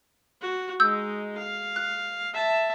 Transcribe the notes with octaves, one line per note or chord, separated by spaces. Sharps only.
F#4
G#3 D#4 E6 G6
F5
F#6
E5 A5